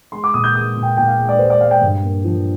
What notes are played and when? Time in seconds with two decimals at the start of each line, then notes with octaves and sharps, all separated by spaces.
0.12 G#3 C6
0.24 D6
0.34 A#2 D#6
0.44 G6
0.55 G#3 D#6
0.76 A#2
0.83 G5
0.97 A#2 G5
1.08 F5
1.18 G#3
1.29 D5
1.39 G#3 C5
1.50 D5
1.60 G#3 F5
1.71 G5
1.82 G2
2.03 A#3
2.25 F3